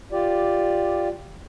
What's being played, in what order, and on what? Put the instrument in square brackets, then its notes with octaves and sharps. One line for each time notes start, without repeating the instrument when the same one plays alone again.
[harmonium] F4 G4 D5